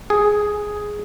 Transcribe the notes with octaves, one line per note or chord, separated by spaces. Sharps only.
G#4